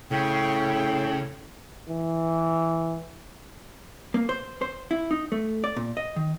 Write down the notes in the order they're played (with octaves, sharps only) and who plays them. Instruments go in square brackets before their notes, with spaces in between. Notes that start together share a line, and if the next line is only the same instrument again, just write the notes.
[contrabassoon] A2 [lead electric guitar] C#3 [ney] G5
[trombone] E3
[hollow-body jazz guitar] A#3
C5
C5
E4
D#4
A3
D5
A#2
D#5
D#3